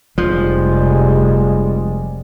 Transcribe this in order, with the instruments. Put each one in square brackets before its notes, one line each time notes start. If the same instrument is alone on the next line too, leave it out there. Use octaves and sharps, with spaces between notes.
[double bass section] F1 G3 G#3 [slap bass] F3